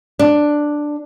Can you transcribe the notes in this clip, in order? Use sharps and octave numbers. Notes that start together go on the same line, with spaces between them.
D4